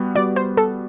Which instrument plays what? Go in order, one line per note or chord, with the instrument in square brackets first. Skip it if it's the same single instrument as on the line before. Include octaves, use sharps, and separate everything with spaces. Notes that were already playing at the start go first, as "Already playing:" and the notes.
Already playing: [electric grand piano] G3 B3 F#4
[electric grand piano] G3 B3 F#4 [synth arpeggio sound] D5
[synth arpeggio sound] C5
A4